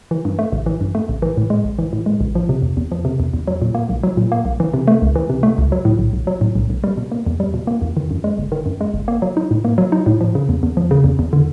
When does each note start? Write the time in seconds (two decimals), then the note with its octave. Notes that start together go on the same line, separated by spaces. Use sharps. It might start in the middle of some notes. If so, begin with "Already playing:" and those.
0.11 E3
0.25 G2
0.39 A3
0.53 A1
0.66 E3
0.81 G2
0.95 A3
1.09 A1
1.22 E3
1.37 A2
1.50 G#3
1.65 A1
1.79 E3
1.93 A2
2.06 G#3
2.21 A1
2.35 F3
2.49 C3
2.62 E2
2.77 E2
2.92 F3
3.05 C3
3.20 E2
3.34 E2
3.48 F#3
3.62 A#2
3.75 A#3
3.89 B1
4.03 F#3
4.17 A#2
4.32 A#3
4.45 B1
4.60 E3
4.74 C3
4.88 A3
5.02 C#2
5.16 E3
5.30 C3
5.43 A3
5.58 C#2
5.72 F#3
5.85 A2
5.99 B1
6.13 B1
6.27 F#3
6.41 A2
6.55 B1
6.70 B1
6.84 G3
6.97 B2
7.12 A#3
7.27 E2
7.40 G3
7.54 B2
7.67 A#3
7.82 E2
7.97 D#3
8.11 F#2
8.24 G#3
8.38 G1
8.52 D#3
8.66 F#2
8.81 G#3
8.94 G1
9.08 A#3
9.22 F#3
9.37 D#4
9.51 A2
9.65 A#3
9.78 F#3
9.92 D#4
10.06 A2
10.21 F3
10.35 C#3
10.49 E2
10.63 E2
10.77 F3
10.91 C#3
11.04 E2
11.19 E2
11.33 D3